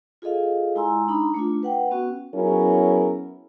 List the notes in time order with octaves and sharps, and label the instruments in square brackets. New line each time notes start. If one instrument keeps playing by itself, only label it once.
[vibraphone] F4 G#4 A4 D#5 F5
G#3 E4 G#5 A#5 C6 E6
D4 D#4 A#5 B5
A3 D4 F4
B4 F#5 G5
B3 C#4 F#4
[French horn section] F#3 B3 C#4 E4 G#4 A#4